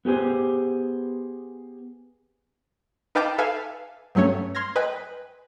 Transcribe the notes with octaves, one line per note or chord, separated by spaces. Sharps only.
B3 G4 G#4 C5
D#4 B4 F5 G5 A5 D6
A4 B4 E5 F5 G#5
G2 F#3 A3 C#4 C#5
C6 F6 G#6 A#6
B4 D#5 G5 G#5 B5